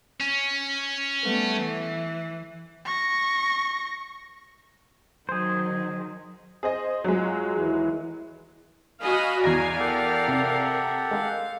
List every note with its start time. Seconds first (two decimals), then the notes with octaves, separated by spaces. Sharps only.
0.21 C#4
1.24 G3 A3 B3
1.61 E3
2.85 C#6 A#6
5.29 D#3 F#3 G#4 C5
6.63 G#4 C5 D#5
7.04 F#3 G#3 F4 G#4
7.57 D#2 E3
9.01 F#4 D#5 F5 G#5 B5
9.44 E2 D5 F5 G#5 A#5 A#6
9.80 G4 A4 A#4 F#5
10.28 C3
11.11 G#3 F5